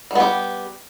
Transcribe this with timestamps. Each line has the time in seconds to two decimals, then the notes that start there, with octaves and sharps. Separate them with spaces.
0.11 G3
0.15 B3
0.20 G4